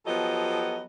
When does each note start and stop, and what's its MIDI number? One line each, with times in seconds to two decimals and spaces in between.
0.06 0.83 53
0.06 0.83 54
0.06 0.83 59
0.06 0.83 67
0.06 0.83 69
0.06 0.83 75